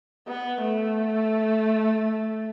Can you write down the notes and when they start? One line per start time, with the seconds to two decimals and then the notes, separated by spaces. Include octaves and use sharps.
0.28 B3
0.62 A3